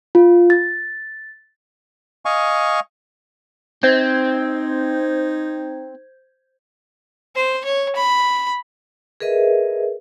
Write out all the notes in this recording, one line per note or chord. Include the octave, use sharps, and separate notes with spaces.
F4
A6
D#5 F5 G#5 C#6
C4 D#4 C5 G6 G#6
C5
C#5
B5
G#4 A#4 B4 D#5 E5